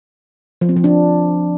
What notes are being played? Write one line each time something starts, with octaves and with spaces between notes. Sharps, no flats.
F3
C4
F3
D4